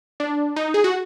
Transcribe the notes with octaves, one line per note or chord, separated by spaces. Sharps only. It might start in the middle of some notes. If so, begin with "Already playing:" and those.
D4
D#4
G#4
F#4